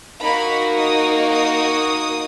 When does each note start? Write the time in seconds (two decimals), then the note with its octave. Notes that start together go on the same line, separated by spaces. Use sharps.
0.23 A#3 D#4 F#4 B5
0.79 D#6
1.33 D#6